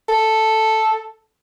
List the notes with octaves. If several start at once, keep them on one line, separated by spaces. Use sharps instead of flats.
A4